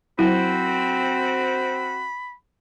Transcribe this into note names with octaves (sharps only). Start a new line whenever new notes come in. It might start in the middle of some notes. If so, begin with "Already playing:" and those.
F#3 C4 E4 F#4 B5